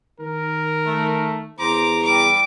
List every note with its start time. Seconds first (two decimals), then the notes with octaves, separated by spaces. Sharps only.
0.20 D#3 A#4
0.86 A3
1.59 E2 C5 A#5 D6
2.03 G3 D6